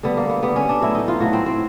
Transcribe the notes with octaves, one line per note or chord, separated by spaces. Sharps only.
D3 G3 B3
A#3
B3
D3 G3 B3
C#4
D4
A2 F#3 A3 E4
D#4
F4
A2 F#3 A3 F#4
C4
C4